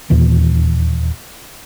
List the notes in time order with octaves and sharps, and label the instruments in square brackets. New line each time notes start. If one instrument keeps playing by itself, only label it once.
[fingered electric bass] E1 D#2 A#2 E3